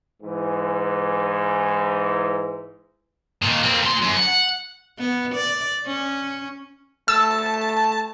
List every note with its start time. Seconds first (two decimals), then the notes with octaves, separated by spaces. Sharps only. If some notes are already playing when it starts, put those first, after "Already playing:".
0.22 G#2 E3
3.42 A#2 D#3
3.63 A#3 C4
3.83 A#2 C6
4.03 F#2
4.17 F#5
4.98 B3
5.35 D5
5.86 C#4
7.08 A3 A5 E6